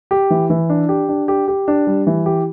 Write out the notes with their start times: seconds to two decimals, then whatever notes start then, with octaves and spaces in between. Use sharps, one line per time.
0.11 G4
0.30 E3
0.50 E3
0.70 D4
0.89 G4
1.09 D4
1.28 G4
1.48 G4
1.68 D4
1.87 G3
2.07 E3
2.26 G4